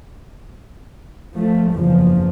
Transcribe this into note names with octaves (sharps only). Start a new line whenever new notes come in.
F3 A3
F#1 E2 F3